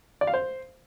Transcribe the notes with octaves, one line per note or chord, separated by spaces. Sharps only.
D5
F5
C5